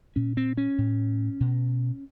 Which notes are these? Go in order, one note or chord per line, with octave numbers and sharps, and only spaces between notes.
A#2 C#4
C4
C#4
A2
B2